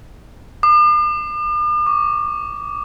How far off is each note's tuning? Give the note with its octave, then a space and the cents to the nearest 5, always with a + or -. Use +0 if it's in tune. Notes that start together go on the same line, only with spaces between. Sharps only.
D6 +45
D6 -35